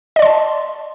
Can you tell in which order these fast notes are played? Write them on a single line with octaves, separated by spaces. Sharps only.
D#5 D5 C6 A5